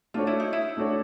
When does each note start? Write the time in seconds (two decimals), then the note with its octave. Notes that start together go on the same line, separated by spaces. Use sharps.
0.14 A3 D4 F4 F#4 A4 C#5
0.27 E4
0.40 D#4
0.53 E4
0.77 A3 D4 F#4 A4 C#5